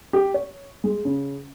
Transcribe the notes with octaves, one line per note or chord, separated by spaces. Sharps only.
G4
C#5
G#3
C#3